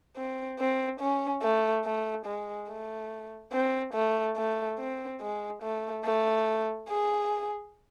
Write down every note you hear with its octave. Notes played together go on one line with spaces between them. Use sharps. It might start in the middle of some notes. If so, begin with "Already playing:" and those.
C4
C4
C#4
A3
A3
G#3
A3
C4
A3
A3
C4
G#3
A3
A3
G#4